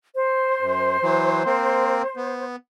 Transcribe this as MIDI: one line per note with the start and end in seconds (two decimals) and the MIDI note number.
0.14 2.44 72
0.61 0.97 42
1.02 1.43 52
1.02 1.43 54
1.46 2.02 58
1.46 2.02 60
2.17 2.56 59